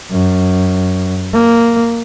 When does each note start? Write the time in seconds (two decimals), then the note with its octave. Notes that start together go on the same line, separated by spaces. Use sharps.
0.11 F#2
1.33 A#3